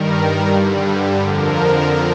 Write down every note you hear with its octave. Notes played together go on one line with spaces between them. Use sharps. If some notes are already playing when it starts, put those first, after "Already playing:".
Already playing: G2 D#3 G3 A#4
G2 D3 G3
F2 D3 F3 A#4